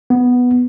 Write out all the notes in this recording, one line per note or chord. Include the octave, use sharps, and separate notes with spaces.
B3